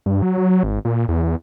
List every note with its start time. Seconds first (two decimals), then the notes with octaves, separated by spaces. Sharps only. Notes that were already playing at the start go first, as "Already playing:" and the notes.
0.06 G2
0.22 F#3
0.38 F#3
0.50 F#3
0.63 G#1
0.85 A#2
1.08 E2
1.22 E2